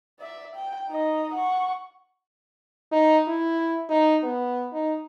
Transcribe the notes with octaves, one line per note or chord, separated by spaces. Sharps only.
D5 E5
G5
D#4 D#5
F#5 C#6
D#4
E4
D#4
B3
D#4